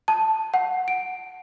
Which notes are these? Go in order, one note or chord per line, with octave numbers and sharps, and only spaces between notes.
A5
F#5
D7